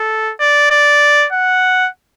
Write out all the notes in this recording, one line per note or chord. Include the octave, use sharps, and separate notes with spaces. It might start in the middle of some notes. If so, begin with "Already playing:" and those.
Already playing: A4
D5
D5
F#5